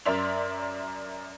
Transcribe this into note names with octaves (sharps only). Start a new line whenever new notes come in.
F#2 A#4 D5 E5 C6 F7